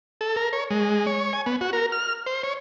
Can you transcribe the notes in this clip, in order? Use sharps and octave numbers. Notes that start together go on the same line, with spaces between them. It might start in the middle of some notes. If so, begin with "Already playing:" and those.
A4
A#4
C#5
G#3
C#5
G#5
B3
F#4
A#4
F6
C5
C#5